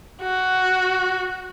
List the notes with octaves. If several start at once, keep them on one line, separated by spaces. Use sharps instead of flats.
F#4